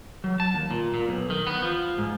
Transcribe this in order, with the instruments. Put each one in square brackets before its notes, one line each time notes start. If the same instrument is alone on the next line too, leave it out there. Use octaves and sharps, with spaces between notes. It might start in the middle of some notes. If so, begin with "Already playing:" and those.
[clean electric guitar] F#3
A5
D#2
A#2
A#2
B1
D#3
B3
F3
G#2